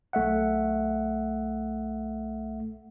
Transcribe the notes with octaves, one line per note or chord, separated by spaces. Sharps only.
B1 A3 E5 F#5